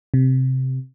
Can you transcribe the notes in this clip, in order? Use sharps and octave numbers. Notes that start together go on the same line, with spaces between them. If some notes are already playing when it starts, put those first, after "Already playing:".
C3